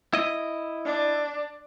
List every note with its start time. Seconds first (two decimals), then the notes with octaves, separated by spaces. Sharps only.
0.13 E4 D#5
0.85 D4